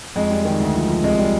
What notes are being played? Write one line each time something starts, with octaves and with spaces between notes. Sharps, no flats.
F2 G#3
G3
D#3
D2
F3
F3
C2 G#3
G3